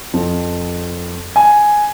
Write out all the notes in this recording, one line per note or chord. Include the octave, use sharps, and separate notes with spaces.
F2
G#5